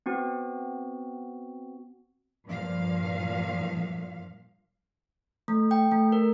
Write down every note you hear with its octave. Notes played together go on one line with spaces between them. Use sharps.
B3 C4 F#4
G2 A#2 F3 F5
A3
G5
A3
A#4